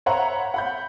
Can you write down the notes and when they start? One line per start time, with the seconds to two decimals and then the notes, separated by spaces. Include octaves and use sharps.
0.06 C5 C#5 E5 F#5 A#5 B5
0.54 F#5 B5 G6